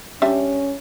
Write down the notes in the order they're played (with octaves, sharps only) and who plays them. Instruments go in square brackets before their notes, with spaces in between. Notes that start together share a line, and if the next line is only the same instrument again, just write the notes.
[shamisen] G3 D4 E5 [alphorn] C#4